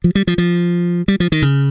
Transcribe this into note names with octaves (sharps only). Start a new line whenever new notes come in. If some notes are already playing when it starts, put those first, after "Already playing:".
F3
G3
F3
F3
G3
F3
D#3
C#3